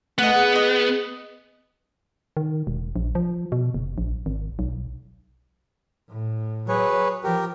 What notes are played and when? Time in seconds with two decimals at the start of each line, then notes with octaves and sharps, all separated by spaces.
0.18 A3 B3 D#5 F#5
0.34 G#4
0.56 D#5
2.37 D#3
2.67 E1
2.96 A#1
3.15 F3
3.52 B2
3.74 F#1
3.98 A#1
4.26 G#1
4.59 B1
6.10 A2
6.69 F#3 G#4 B4 C#5
7.24 F3 G4 A#4